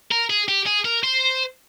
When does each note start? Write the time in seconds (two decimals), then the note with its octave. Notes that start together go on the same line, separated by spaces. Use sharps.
0.11 A#4
0.30 G#4
0.48 G4
0.66 G#4
0.85 A#4
1.04 C5